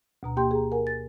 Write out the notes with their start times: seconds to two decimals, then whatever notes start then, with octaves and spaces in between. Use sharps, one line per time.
0.23 D2 B2 A#5
0.36 A#3 G4 G5 C6 G6
0.51 G#4 A#5
0.72 A#4 F#5 G#5
0.87 A6